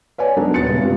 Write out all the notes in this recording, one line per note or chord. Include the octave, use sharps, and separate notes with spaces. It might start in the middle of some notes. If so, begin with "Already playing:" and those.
B4 C#5 D5 G#5
F#3 B3 D4 D#4 A4
D#1 A6 C#7
C#3 G3 B3
G2 C3 G3 F4 G4